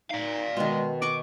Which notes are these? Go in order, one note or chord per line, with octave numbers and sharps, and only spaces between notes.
D#4 D5 F5
B2 D#3 G#3
D#5 F#5 C#6 D6